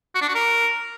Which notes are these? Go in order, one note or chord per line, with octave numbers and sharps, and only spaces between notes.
F#4
D4
F#4
A#4